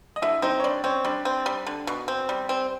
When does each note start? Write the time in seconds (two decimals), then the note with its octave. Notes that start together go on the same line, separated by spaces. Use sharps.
0.16 D#5
0.22 D3 E4 E5
0.42 C4 D#4 D#5
0.60 C#5
0.64 G3 D4 D5
0.84 C4 C#4 C#5
1.05 G3 D4 D5
1.25 C4
1.46 G3
1.67 D3
1.87 B2
2.08 C4
2.29 G3
2.49 C4